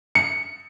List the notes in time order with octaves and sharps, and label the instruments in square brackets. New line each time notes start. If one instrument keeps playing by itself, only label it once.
[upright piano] C#7